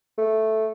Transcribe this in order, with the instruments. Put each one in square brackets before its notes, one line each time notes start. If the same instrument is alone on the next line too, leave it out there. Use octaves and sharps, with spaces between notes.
[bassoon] A3